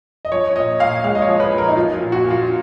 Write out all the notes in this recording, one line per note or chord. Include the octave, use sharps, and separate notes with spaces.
D#5
F3 C#5
A#2 D#5
A#2 F5
G#3 F5
D#5
C#5
F3
B4
A#2
A#4
D#4
F3 F4
F4
A#2
F#4
A#2
F4